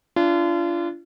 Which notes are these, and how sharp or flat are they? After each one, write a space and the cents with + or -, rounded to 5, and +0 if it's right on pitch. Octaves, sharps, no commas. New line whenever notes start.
D4 -15 F4 -35